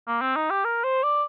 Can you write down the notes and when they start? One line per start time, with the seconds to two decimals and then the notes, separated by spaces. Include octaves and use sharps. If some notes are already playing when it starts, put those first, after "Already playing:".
0.08 A#3
0.21 C4
0.36 D#4
0.50 G4
0.65 A#4
0.84 C5
1.03 D5